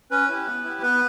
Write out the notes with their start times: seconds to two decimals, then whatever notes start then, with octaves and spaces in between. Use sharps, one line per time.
0.11 C#4 B4
0.29 E4 G4
0.47 B3
0.64 E4 G4
0.82 B3 B4